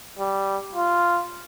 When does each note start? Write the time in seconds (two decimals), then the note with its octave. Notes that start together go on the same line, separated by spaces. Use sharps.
0.19 G3
0.75 F4